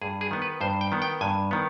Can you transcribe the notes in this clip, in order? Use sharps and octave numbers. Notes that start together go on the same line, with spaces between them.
G2 G#4
G#4
D#3 B3
B4
G2 C5
G5
D#3 B3
G5
G2 G#5
D#3 B3